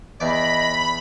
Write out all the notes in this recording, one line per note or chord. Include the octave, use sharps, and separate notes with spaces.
E2 D5 D#5 B5